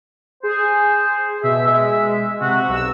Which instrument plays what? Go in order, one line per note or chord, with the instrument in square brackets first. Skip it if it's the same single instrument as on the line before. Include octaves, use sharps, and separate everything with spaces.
[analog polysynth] G#4 [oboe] C5
[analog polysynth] B2 [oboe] E5
[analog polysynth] G#3 [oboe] E5
[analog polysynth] C3 [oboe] F#4
[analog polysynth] B1 E6